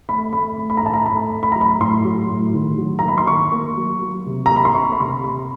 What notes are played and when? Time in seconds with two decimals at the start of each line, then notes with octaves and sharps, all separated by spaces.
0.09 A3 B5
0.33 A3 B5
0.58 A3
0.70 B5
0.77 A#5
0.82 A2 A5
0.94 A#5
1.06 A3 B5
1.32 A2
1.43 B5
1.52 F#3 A#5
1.61 B5
1.80 A2 C6
2.05 F#3
2.29 A2
2.54 D#3
2.78 F#3
2.99 A#5
3.04 A#3 B5
3.18 C6
3.27 D#3 C#6
3.52 A#3
3.77 F#3
4.02 F#3
4.26 C3
4.46 A#3 A#5
4.56 B5
4.65 C6
4.75 A#3 C#6
4.92 B5
5.00 C3 C6
5.24 C3 B5